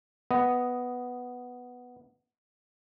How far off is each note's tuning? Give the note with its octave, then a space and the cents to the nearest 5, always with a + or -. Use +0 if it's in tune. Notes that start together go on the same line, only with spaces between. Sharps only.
B3 +0 D#5 +0